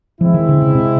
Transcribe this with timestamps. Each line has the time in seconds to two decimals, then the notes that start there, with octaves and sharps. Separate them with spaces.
0.21 F3 G#3 C4 E4
0.34 D#3
0.49 D3
0.62 C#3
0.75 C3